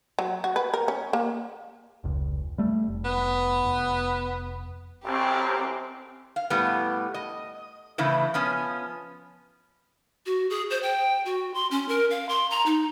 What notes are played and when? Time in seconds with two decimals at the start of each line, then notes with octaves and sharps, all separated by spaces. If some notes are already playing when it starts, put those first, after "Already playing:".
0.19 F#3
0.44 F#4
0.56 B4
0.74 A#4
0.88 C#4
1.13 A#3
2.04 F1 C#2
2.58 G3 A3
2.88 F1
3.04 B3
3.64 F1
5.05 A1 F#2 C4 G4
6.36 F5
6.50 A2 G3 B3
7.14 D#5
7.98 A2 C#3 E3 E4
8.34 F3 B3 C#4
10.26 F#4
10.50 G#4
10.70 C5
10.83 G5
11.25 F#4
11.54 C6
11.71 C#4
11.89 A#4
12.11 F5
12.29 C6
12.50 A#5
12.66 D#4